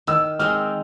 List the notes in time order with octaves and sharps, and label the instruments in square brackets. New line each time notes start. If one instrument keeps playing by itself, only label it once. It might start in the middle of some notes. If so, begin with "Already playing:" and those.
[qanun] D#3 [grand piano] E6
[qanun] G#3 C4 D#4 [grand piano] F6